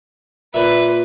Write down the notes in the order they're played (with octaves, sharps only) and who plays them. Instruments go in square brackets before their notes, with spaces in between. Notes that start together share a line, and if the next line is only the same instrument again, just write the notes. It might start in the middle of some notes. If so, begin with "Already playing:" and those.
[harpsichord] A#2 E5 [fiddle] B4